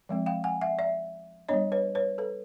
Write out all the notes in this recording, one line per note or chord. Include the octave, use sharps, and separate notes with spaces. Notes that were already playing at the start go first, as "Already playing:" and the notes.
F3 G#3 C4
F5 G5
F#5 G#5
E5 F#5
D5 E5
G3 B3 D4 C#5 D#5
B4 C#5
B4 C#5
A4 B4